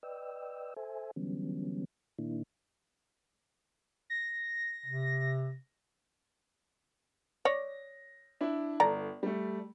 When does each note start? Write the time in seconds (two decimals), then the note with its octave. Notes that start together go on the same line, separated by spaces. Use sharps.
0.03 B4 D5 D#5 G5 E6
0.77 A4 C5 E5 G#5
1.16 D3 E3 F#3 G3 B3 C#4
2.19 A#2 D#3 A#3 D4 E4
4.10 A#6
4.86 C3
7.45 C#5 D5 A#6
8.41 D4 E4
8.80 G1 A4 D5 A#5
9.23 G3 A3